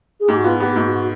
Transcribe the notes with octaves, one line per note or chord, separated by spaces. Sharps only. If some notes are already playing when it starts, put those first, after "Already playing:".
G#4
G#2 G4
F#4
B3 F4
B3 G4
G#2 F#4
F#4